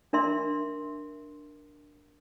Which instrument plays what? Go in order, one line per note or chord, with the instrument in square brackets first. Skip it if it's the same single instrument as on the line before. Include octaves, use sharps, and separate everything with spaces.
[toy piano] D4 A#4 E5 C6